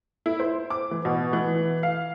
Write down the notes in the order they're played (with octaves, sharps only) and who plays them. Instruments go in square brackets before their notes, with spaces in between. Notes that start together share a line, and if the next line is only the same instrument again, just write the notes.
[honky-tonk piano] E4
C5
D6
E3
B2
E3
F5